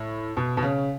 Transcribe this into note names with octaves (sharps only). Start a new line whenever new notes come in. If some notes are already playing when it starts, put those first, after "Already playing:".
Already playing: A2
B2
B2
C#3